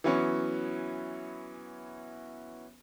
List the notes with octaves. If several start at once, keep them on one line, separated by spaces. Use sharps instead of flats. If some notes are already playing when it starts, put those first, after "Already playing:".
E3 F#3 B3 C#4